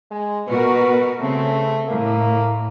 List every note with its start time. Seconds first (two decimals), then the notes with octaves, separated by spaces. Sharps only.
0.11 G#3
0.48 B2 F#4 A#4 B4
1.20 C#3 A3 C4
1.88 A2 A#3